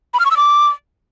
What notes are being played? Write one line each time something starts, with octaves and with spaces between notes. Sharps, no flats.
B5
F6
C#6
E6
D6